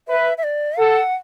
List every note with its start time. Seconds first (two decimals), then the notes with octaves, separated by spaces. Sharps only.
0.08 B4 E5
0.38 E5
0.44 D5
0.78 A4 F#5